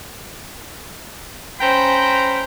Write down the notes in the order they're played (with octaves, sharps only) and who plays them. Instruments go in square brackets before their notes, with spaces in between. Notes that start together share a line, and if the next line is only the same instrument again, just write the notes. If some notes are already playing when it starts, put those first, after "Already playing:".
[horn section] C#4 C5 G5 A#5 B5